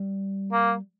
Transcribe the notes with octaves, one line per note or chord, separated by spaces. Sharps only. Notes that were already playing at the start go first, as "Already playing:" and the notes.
Already playing: G3
A#3